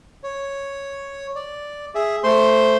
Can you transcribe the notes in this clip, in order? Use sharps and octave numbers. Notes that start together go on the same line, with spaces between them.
C#5
D5
G#4 E5
A3 C5 C6